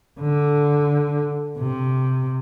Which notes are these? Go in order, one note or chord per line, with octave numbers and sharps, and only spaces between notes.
D3
C3